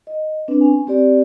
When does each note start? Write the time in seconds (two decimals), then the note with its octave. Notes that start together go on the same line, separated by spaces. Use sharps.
0.07 D#5
0.48 C4 D4 B4
0.61 C#4 G#5
0.87 C4 G4 D5